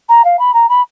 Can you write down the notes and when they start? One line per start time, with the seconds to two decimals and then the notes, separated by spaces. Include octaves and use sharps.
0.09 A#5
0.24 F5
0.39 B5
0.53 A#5
0.69 B5